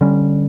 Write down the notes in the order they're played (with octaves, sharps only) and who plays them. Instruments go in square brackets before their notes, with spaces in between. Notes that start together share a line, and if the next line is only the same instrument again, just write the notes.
[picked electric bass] D3 G3 C#4